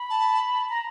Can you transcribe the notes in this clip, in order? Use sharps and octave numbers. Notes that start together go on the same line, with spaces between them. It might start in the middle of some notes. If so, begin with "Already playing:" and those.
Already playing: B5
A5
A#5